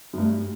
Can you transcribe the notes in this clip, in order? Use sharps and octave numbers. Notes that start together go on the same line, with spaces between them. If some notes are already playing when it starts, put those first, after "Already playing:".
F#2
G2 A3